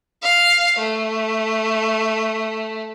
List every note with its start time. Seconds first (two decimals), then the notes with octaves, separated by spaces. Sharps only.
0.23 F5
0.78 A3